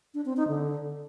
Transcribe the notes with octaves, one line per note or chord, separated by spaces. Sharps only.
D4
C4
D#4
D3